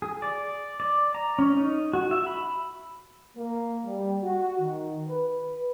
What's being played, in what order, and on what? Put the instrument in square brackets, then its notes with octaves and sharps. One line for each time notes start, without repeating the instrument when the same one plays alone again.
[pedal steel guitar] G#4
D5
D5
A#5
C#4
D#4
F#4
E5
B5
[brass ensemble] A#3
G3
F#4
D#3
B4